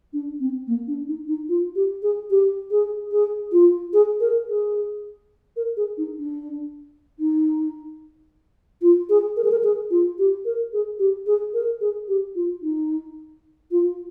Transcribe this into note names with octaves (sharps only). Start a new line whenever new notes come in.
D4
C4
A#3
D4
D#4
D#4
F4
G4
G#4
G4
G#4
G#4
F4
G#4
A#4
G#4
A#4
G#4
D#4
D4
D#4
F4
G#4
A#4
G#4
A#4
G#4
F4
G4
A#4
G#4
G4
G#4
A#4
G#4
G4
F4
D#4
F4